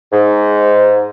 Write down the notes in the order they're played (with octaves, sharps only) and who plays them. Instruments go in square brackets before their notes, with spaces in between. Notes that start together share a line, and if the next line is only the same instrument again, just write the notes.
[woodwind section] G#2